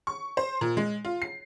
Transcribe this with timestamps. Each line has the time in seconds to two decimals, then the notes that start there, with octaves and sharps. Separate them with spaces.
0.07 C#6
0.37 C5
0.61 A#2
0.77 G#3
1.05 F4
1.22 C7